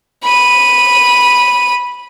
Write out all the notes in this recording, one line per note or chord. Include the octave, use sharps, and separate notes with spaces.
B5 D#7